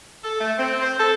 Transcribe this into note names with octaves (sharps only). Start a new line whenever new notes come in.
A4
A3
C4
C5
A4